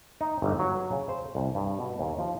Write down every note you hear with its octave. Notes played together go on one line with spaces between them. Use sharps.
D#4
G1
F#3
C#3
C5
C2
G2
B2
D#2
F3